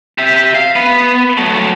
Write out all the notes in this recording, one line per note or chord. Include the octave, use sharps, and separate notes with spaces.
G4 E5
F5
B3
F#3 A3